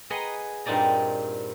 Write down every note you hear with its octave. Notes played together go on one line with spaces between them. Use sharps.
G#4 B4 D#5 F#5 A#5 C6
G2 A#2 C4 D#4 D5 A#5